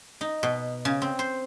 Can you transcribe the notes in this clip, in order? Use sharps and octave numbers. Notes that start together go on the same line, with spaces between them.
D#4
B2
C#3
C4
C5